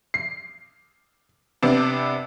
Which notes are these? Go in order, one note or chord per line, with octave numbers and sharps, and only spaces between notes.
C7
C3 B3 D4